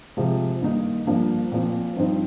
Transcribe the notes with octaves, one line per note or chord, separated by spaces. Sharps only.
C3 F3 G#3
G2 D#3 A#3 D#4
G2 F3 A#3 D4
A#2 F3 C4
G2 F3 C4 D#4